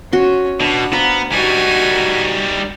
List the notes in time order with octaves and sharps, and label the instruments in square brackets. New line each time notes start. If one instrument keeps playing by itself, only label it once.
[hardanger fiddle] C#4 [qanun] F#4 C6
[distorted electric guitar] B2 [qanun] D4 [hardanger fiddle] F#5
[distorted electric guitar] B3 [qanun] C5 F5 A#5
[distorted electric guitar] G3 D#4 [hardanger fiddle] F#4 G#5